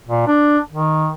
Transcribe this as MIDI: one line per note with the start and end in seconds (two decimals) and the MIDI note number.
0.08 0.26 46
0.27 0.58 62
0.72 1.10 51